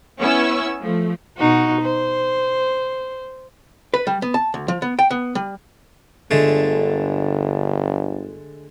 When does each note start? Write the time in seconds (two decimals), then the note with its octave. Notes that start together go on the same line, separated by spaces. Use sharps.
0.19 B3 C#4 E4 C#6 E6
0.81 F3 A3
1.38 B2 D#4 F#4
1.81 C5
3.94 B4
4.07 G3
4.22 B3
4.34 A5
4.54 D2
4.68 F3
4.82 B3
4.99 G5
5.11 B3
5.35 G3
6.31 G1 D3 G#3 A3